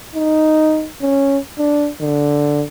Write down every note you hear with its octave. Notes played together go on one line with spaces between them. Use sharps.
D#4
C#4
D4
D3